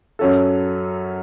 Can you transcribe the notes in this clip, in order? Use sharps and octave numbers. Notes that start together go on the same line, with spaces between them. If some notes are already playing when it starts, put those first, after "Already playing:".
F#2 F#3 C#4 A4